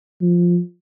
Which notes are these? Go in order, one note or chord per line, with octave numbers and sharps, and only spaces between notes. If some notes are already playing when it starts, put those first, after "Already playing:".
F3